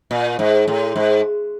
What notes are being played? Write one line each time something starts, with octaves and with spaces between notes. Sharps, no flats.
A#2
G#2
A2
G#2